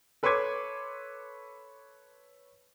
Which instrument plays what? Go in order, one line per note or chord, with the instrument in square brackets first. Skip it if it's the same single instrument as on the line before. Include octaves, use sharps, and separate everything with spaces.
[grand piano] A4 B4 C#5 C6 D6 G#6